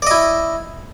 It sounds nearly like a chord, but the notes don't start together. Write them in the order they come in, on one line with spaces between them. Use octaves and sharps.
D5 D#5 E4